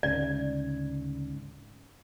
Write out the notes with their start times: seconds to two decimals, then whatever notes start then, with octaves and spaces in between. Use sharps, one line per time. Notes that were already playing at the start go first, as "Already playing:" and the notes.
0.03 D2 G#2 C#3 D5